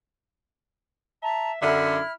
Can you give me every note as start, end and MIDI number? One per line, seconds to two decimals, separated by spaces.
1.23 1.61 76
1.23 1.50 81
1.23 1.50 82
1.62 1.99 42
1.62 1.99 50
1.62 2.12 64
1.62 1.95 76
1.62 2.12 89